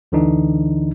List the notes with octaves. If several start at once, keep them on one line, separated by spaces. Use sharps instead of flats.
D2 D3 E3 D4 D#4